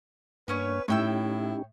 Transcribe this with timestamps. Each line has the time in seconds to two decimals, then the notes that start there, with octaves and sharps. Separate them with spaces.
0.48 G2 A#3 B3 C#4 D4 B4 C#5
0.88 A2 C#4 D#4 E4 G4 C#5 G5 E6